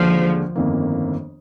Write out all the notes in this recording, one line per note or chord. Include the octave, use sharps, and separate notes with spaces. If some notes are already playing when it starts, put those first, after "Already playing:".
Already playing: D#2 D3 F3 G#3
G1 F2 D#3 A#3